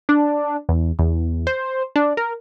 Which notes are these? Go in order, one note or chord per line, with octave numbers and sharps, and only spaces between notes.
D4
E2
E2
C5
D4
A#4